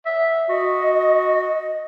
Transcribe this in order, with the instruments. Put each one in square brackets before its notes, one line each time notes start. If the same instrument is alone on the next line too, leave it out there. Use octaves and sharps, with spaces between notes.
[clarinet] E5
[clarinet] F#4 [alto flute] D#5